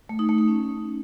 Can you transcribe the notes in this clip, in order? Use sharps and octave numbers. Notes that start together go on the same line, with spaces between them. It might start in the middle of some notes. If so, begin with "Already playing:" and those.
A3
D#4
A3
D#4
C#4